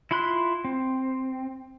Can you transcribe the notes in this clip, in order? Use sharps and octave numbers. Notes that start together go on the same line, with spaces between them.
E4 F4 B5 C6 F#6
C4